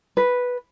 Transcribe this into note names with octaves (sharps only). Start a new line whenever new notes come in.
B4